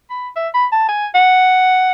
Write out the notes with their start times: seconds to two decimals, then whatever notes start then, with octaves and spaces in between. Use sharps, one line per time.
0.10 B5
0.36 E5
0.54 B5
0.72 A5
0.89 G#5
1.15 F#5